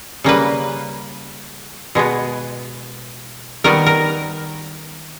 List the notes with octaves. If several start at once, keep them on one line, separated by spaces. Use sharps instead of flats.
C#3 G3 A#3 B4
B2 G#3 B3
D#3 G3 B3 A#4
A#4